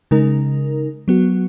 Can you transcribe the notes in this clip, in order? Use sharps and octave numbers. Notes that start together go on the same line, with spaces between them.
C#3 G#3 D#4 A#4
F#3 B3 F#4